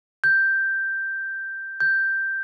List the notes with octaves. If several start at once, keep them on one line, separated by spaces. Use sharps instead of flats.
G6
G6